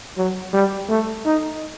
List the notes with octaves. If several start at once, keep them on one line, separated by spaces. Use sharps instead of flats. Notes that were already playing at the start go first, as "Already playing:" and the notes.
F#3
G3
A3
D#4